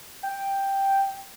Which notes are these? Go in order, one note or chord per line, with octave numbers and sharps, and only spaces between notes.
G5